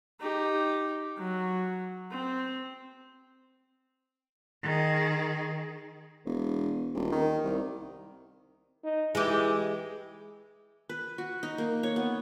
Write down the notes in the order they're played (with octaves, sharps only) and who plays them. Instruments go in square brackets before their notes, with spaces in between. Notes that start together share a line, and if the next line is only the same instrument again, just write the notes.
[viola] D#4 G4
F#3
C4
[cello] D#3 G#4
[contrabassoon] E1
D#1
D#3
C2
[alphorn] D#4
[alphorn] E3 [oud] G#3 G4
[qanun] B4
F#4
D#4
A#3
C#5
B3